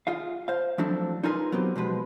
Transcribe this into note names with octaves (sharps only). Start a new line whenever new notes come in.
F4 G#4 F5
C5 F5
F3 F#3 A3 C4 D4 E4
D#4 F4 G#4 A#4 B4 C6
F#3 B3 C4 G4
B2 F3 G#3 B4